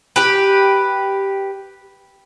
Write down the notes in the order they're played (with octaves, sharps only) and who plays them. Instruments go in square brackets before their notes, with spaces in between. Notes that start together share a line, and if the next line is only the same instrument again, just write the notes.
[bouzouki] G4 B4